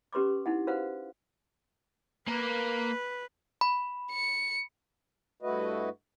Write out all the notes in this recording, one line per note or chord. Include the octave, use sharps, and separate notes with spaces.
C#4 G4 B4 C6 D6
D#4 E4 F#5
F#4 B4 C5 F5 F#5
A#3 A#4 B4
B5
C#7
G2 A3 E4 F#4 B4 D#5